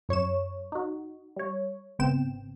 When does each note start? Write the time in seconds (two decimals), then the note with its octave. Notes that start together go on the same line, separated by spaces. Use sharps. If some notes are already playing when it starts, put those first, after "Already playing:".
0.09 F#2 C#5 C#6 E7
0.72 D#4 F#4
1.36 G3 C#5
1.99 G#1 C#3 B3 C4 G5 E7